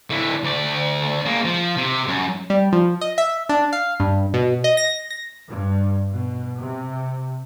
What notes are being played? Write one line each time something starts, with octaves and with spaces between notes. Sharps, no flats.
D3 E4
D2 D5
A#3 G#4
F3
C3
F#2
G3
F3
D#5
E5
D4
F5
G2
B2
D#5
A#6
A#6
G2
B2
C3